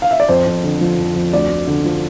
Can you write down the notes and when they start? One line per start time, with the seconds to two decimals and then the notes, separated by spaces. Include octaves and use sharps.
0.02 F5
0.11 E5
0.20 D5
0.28 F2 C5
0.47 F2
0.64 D3
0.81 F3
0.98 F2
1.15 F2
1.33 D2 D5
1.50 D2
1.67 D3
1.84 F3